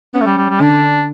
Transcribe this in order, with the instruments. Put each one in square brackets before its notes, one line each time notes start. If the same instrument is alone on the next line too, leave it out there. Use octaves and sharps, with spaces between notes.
[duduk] B3 [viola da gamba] C#4
[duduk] A3
G3
G3
G3
[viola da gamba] D3 [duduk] D4